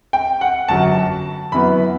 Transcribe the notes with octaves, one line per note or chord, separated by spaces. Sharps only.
G5
F#5
G1 F#2 F#3 A5
F#2 E3 B3 B5